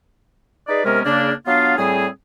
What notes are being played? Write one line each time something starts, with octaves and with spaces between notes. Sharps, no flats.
D#4 G#4 B4 D5
C3 G#3 B3 C#4 A#4
C#3 A#3 D4
F#3 B3 D4 F4 F5
A2 G3 C4 G#4